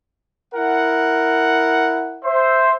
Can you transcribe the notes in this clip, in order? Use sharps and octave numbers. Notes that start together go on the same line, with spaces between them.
E4 A#4 F#5
C5 E5